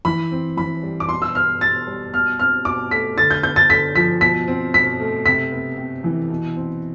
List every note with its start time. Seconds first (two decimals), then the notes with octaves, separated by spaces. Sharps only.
0.05 E3 B5
0.31 C4
0.57 E3 B5
0.83 G3
1.00 D6
1.09 B2 C6
1.22 E6
1.35 B3 F6
1.61 B2 A6
1.87 G3
2.14 B2 F6
2.39 C4 F6
2.65 B2 D6
2.91 A3 B6
3.17 D3 A6
3.31 G6
3.43 B3 G6
3.56 A6
3.70 D3 B6
3.95 F3 B6
4.21 B2 B6
4.48 C4
4.74 B2 B6
5.00 A3
5.26 C3 B6
5.52 B3
5.78 C3
6.04 E3
6.30 B2
6.56 C4